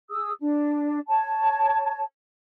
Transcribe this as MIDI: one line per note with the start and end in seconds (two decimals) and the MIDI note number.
0.11 0.31 68
0.11 0.31 87
0.11 0.31 88
0.40 0.99 62
1.08 2.03 73
1.08 2.03 81